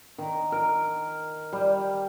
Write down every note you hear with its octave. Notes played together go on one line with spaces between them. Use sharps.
D#3
A#4
G3